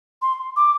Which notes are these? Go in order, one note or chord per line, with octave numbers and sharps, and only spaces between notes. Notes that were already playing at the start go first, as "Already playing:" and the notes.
C6
D6